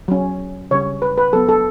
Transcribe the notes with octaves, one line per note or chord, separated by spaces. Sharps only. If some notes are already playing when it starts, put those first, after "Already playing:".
F#3 C#4
C#3 G3 C#4 C#5
B4
B4
F#3 B3 A4
A4